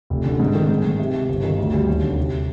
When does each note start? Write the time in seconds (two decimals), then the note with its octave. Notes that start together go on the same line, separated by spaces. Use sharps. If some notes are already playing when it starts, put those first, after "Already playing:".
0.10 F1
0.26 D3
0.39 G#2
0.55 D#3
0.69 G#2
0.85 G#2
0.99 C3
1.14 C3
1.28 G1
1.44 D#3
1.59 D2
1.74 G3
1.88 D#2
2.03 D3
2.17 C2